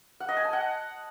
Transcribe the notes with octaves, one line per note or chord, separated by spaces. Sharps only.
F#5
D#5
G#5
A5
F#5